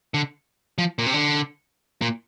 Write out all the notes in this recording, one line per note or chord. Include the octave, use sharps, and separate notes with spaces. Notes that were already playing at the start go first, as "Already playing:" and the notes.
D3
F3
A#2
C3
D3
A#2